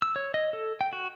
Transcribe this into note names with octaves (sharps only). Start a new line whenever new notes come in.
E6
C#5
D#5
A4
G5
F#4